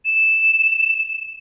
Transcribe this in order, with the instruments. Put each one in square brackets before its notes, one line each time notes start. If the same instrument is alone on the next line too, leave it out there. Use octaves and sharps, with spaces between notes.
[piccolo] E7